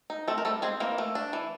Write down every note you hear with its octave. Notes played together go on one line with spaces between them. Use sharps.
D#4
A3 C4 A4
A#4
G3 A3 A4
G#3 C4 G#4
E3 A#3 A#4
A3
D4
E3